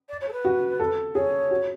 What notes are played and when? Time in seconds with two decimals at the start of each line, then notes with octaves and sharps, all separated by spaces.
0.09 D5
0.21 C#5
0.28 A4
0.32 B4
0.45 F#4
0.80 A4
1.15 G#4 C#5
1.51 F#4